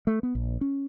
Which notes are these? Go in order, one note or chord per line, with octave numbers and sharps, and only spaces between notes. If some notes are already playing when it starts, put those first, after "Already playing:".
A3
B3
A#1
C#4